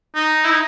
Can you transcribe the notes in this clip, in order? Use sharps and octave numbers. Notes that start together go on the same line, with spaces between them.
D#4
E4
D#4